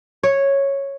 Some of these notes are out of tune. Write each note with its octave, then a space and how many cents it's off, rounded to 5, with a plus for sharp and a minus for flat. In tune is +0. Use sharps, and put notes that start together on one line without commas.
C#5 -5